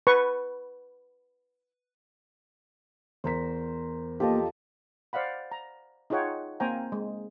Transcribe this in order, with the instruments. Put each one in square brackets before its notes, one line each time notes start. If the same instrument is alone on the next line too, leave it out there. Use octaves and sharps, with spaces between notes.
[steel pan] B4 C#6
[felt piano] E2 B6 [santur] A#4 C5
[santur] F3 A4 D#5 [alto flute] A#3 [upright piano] G4
[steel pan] C5 D5 F5 F#5 B5
A#5
D#4 F4 G#4 C#5 F#5 G5
A#3 C4 C5 G5 G#5 A#5
G#3